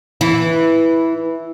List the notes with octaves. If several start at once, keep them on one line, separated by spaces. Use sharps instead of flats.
E3